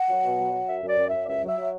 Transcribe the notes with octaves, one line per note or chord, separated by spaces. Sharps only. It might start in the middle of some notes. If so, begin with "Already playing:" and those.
Already playing: F#5
F#3
B2
F#3
F#3
F#2 E5
F#2 D5
F#2
F#2 E5
D5
C#2 E5
F#3 E5
F#3